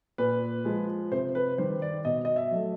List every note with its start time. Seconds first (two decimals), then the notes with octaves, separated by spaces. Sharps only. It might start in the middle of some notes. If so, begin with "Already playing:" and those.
0.18 A#2 B4
0.65 F3 G#3
1.12 C3 C5
1.35 B4
1.58 D#3 G3 C5
1.82 D5
2.05 B2 D#5
2.25 D#5
2.36 E5
2.51 F#3 A3